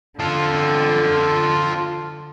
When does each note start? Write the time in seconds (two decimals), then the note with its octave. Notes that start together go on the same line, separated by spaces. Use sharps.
0.19 D3 F4 A4